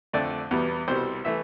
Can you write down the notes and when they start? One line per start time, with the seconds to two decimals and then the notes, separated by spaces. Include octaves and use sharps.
0.13 F2 D3 A3 D5
0.51 E2 B2 G3 B3
0.88 C2 B2 G3 C5
1.25 E3 A3 E5